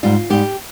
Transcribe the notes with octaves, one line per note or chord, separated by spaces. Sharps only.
G#2 G3 F4
G#2 G3 G4